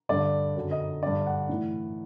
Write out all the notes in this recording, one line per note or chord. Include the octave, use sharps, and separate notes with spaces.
G2 D3 D5
F#2 D3
D#5
G2 D3 D5
F#5
A2 E3